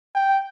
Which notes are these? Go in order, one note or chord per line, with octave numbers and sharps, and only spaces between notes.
G5